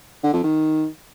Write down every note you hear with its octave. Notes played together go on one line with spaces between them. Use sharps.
D3
F2
D#3